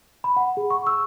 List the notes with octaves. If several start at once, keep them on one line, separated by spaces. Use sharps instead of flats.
B5
F#5
G#4
C#6
E6